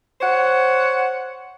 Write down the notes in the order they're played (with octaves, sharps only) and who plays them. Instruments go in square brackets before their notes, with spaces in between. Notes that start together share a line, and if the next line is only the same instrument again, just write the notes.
[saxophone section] C5 C#5 F#5